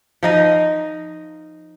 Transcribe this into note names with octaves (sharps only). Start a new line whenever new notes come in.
F3 D#4 D#5